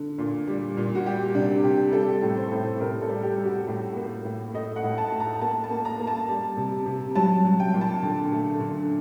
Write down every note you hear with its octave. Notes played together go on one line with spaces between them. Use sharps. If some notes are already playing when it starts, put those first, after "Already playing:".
Already playing: D3
A#2
G3
A#2
F#4
G3 G4
C3 D4
C3 G4
G3 A4
A2
C5
A2
C3 A#4
A4
G3
G4
G3
F#4
A2
A#3
A2
A3 D#5
F#5
A2
A5
A3
A#5
A#3 A5
A5
A#3
A#5
A#3
A5
G3
C3
C3
F#3 A5
F#3
G5
A#2
A5
D3
A3
D3